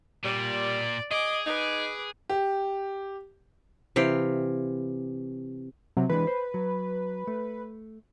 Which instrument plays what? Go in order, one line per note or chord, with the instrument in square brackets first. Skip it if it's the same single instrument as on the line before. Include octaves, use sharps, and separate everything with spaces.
[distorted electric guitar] A#2 [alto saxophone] G3 [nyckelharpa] D5
[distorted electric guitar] G#4 [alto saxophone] D#5 [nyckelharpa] D6
[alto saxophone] D#4 [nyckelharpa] B4 D6
[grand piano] G4
[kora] C3 E3 F5 G5
[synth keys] C3 F#3
[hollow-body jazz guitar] E3 G#3 D4 [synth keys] B4
[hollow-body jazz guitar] C5
F#3
A3